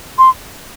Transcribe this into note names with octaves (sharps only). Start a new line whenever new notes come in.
C6